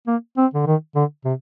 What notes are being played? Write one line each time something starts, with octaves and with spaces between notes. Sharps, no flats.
A#3
C4
D3
D#3
D3
C3